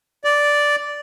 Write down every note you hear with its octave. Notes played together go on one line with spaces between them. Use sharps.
D5